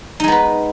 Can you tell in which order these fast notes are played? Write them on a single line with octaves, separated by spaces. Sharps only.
D#4 G#3 B3 B4